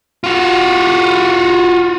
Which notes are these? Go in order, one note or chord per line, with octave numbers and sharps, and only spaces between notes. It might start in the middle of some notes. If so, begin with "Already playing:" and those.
F4 F#4